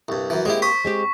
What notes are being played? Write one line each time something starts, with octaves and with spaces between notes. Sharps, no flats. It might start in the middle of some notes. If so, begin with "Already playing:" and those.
C2 G2
F#2 E3
G#3 A#3 C4 E4 G4
C5 C#6 D#6 B6
G#3 C4 G4